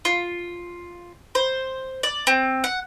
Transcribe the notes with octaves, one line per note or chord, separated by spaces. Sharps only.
F4
C5
D5
C4
F#5